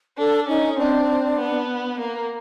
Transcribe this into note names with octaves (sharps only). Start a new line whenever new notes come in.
D4 A4
C#4 D#4
C4 D4
B3
A#3